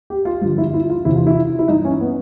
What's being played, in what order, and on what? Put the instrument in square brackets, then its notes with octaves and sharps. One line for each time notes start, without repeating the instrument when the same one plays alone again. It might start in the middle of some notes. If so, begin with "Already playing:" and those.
[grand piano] G4
F4
G2 D3 F3 F4
E4
E4
F4
E2 C3 E3 E4
F4
E4
E4
G2 E3 D#4
C#4
B3